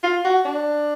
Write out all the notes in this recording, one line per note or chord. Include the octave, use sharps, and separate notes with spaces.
F4
F#4
D4